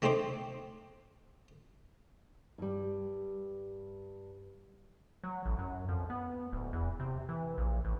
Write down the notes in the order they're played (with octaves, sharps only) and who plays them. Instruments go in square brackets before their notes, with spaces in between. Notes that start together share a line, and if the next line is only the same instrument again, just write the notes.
[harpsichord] D#3 A3 C4 D#4 C5 D6
[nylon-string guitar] G2 G3
[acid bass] F#3
A1
F#2
F2
B3
D1
E2
C3
E3
A#1
A1